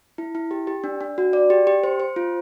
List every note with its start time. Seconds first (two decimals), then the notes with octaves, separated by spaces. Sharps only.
0.18 E4
0.35 E4
0.51 G4
0.67 G4
0.84 D4
1.01 D4
1.18 F#4
1.33 D5
1.50 G4
1.67 G4
1.84 C5
2.00 C5
2.16 F4